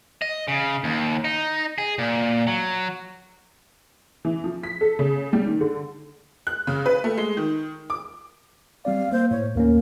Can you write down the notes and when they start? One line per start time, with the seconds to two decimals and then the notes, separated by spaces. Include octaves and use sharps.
0.22 D#5
0.48 C#3
0.84 D#2
1.24 D#4
1.78 G#4
1.99 A#2
2.47 F#3
4.25 E3
4.44 F3
4.63 B6
4.81 A4
4.99 C#3
5.33 G3
5.47 D#3
5.61 D3
6.47 F#6
6.67 C#3
6.86 B4
7.04 A3
7.17 G#3
7.37 D#3
7.90 D6
8.85 G3 C4 D5 F5
9.12 A#3 C5
9.31 A2 C#5
9.55 D#2 A#3 C#4 A#4